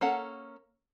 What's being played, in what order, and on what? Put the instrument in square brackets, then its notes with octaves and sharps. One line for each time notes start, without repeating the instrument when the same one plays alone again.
[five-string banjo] A#3 C#4 A4 F#5 A#5